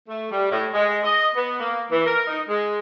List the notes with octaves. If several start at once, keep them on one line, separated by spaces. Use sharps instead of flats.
A3
G3
A2
G#3
D#5
B3
A#3
E3
A#4
D#4
G#3